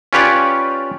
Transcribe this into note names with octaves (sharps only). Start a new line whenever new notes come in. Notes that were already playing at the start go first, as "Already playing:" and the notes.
C#4 F4 G4 B4 C#5 D5